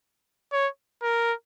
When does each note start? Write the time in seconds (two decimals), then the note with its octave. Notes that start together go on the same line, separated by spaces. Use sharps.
0.53 C#5
1.03 A#4